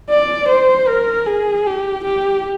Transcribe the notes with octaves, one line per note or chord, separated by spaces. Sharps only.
D5
C5
A#4
G#4
G4
G4